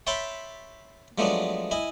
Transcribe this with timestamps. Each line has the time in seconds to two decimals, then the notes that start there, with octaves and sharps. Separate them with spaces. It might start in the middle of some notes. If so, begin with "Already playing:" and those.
0.07 C#5 E5 G5 A5 B5 C6
1.18 F3 F#3 G#3 A3 B3 D4
1.71 E4 D#5 G#5